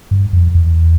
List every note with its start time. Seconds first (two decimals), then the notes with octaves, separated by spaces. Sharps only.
0.11 G2
0.33 F2
0.55 E2